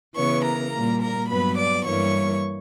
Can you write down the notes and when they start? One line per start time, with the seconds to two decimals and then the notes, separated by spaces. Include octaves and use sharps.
0.17 C#3 E3 B3 C#5 C#6
0.45 A#4 A#5
0.73 A#2 G3 A#3
1.01 A#4 A#5
1.29 G2 F#3 B3 B4 B5
1.58 D5 D6
1.86 G2 E3 G3 A#3 C#5 C#6